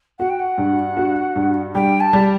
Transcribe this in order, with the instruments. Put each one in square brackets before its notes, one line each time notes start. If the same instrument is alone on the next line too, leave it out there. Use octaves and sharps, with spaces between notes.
[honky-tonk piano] F#4 [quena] F#5
[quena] G5
F#5
[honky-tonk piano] G2
F#4
G2
[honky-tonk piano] G3 [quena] G5
[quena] A5
[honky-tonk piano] G3